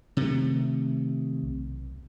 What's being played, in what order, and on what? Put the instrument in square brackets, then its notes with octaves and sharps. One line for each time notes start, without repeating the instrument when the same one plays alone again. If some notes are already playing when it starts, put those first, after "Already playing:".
[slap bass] C3 D#3 A3
[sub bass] B1